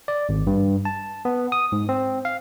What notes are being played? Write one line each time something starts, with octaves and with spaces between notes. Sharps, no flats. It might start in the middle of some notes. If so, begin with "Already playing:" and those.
D5
G#1
G2
A5
B3
D#6
G#2
C4
F5